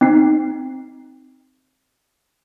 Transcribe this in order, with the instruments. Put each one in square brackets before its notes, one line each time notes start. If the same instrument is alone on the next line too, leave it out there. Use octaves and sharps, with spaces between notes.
[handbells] C4 D#4 C7